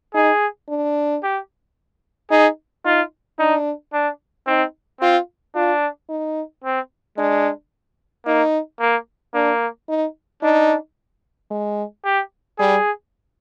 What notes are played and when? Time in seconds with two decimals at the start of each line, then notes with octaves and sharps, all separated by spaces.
0.14 D#4 G#4
0.69 D4
1.23 G4
2.31 D#4 G#4
2.85 D#4 F4
3.39 D4 D#4
3.93 D4
4.47 C4 D#4
5.01 C4 F4
5.55 D4 F4
6.09 D#4
6.64 C4
7.18 G#3 D4
8.26 A#3 D#4
8.80 A#3
9.34 A#3 D4
9.89 D#4
10.43 D4 D#4
11.51 G#3
12.05 G4
12.59 G3 G#4